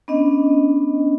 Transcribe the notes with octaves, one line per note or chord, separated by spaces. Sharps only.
B3 C#4 D4 D#5